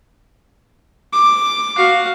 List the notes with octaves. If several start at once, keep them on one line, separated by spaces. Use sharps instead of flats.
D6
F#4 F5